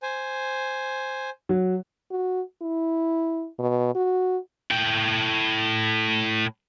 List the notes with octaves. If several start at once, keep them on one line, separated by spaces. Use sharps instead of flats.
C5 G#5
F#3
F#4
E4
B2
F#4
A2 G5